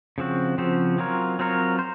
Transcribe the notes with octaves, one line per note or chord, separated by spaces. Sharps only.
C#3 F3 C4 F#4
C#3 F3 C4 F#4
F#3 C4 F4 A#4 C#5
F#3 C4 F4 A#4 C#5
C5